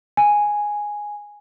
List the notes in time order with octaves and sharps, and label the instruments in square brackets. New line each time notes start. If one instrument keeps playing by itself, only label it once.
[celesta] G#5